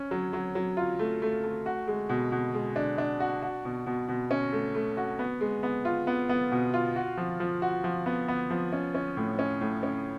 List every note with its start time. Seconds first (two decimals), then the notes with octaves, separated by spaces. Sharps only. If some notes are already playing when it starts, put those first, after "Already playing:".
Already playing: C#4
0.11 F#3
0.33 F#3
0.55 F#3
0.77 F4
0.99 A3
1.22 A3
1.44 A3
1.66 F#4
1.88 G#3
2.09 B2
2.32 B2
2.54 G#3
2.76 D4
2.98 D4
3.20 F#4
3.42 F#4
3.65 B2
3.87 B2
4.09 B2
4.31 C#4
4.52 A3
4.75 A3
4.97 F#4
5.19 B3
5.41 G#3
5.63 B3
5.85 F4
6.07 B3
6.29 B3
6.52 B2
6.74 F4
6.96 F#4
7.17 F3
7.40 F3
7.62 F#4
7.84 F3
8.06 B3
8.28 B3
8.50 F3
8.73 C#4
8.95 C#4
9.17 A2
9.39 C#4
9.61 A2
9.83 C#4